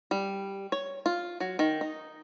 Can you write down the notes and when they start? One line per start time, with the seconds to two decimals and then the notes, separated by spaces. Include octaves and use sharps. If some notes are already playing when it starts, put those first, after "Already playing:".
0.11 G3
0.72 C#5
1.06 F4
1.40 F#3
1.59 D#3
1.81 D#4